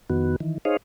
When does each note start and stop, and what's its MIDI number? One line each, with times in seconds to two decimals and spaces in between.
0.10 0.36 41
0.10 0.36 51
0.10 0.36 59
0.10 0.36 66
0.40 0.58 51
0.40 0.58 52
0.65 0.77 63
0.65 0.77 68
0.65 0.77 72
0.65 0.77 73
0.65 0.77 75
0.65 0.77 77